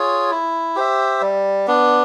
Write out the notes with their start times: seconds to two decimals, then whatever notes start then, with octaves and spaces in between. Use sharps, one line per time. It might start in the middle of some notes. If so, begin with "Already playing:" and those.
Already playing: F4 G#4 C#5
0.31 E4
0.76 G4 C5 E5
1.21 G3
1.67 B3 D4